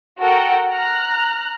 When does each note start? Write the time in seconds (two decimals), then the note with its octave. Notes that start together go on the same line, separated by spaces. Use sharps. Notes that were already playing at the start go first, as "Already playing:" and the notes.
0.20 F#4 A4 A#4 F#5 G5
0.71 A#5 F6 F#6